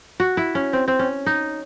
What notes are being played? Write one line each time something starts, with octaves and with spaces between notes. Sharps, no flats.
F#4
E4
C#4
C4
C4
C#4
D#4